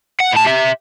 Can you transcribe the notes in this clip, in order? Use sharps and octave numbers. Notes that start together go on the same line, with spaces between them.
F#5
A2 A5
G4 E5